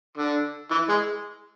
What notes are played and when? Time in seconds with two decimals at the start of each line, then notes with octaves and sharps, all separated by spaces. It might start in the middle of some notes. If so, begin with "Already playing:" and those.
0.17 D3
0.71 E3
0.89 G#3